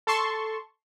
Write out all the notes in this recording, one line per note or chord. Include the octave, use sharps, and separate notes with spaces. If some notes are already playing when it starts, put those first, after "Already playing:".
A4 A5 C6 C#6